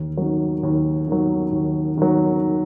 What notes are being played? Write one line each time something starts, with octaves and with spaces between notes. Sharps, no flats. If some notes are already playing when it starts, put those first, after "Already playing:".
Already playing: D#2
D#3 F#3
D#2
D#3 F#3
D#2
D#3 F#3